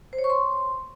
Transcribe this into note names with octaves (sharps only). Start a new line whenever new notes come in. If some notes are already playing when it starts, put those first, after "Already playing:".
C5
C#5
C#6
C6